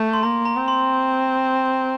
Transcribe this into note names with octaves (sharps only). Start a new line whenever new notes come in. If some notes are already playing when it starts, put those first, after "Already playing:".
Already playing: A3
C6
A#3 A#5
A#5
C4
C6